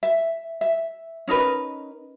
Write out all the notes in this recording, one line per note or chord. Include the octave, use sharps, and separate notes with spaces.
E5
E5
C#4 D#4 A#4 B4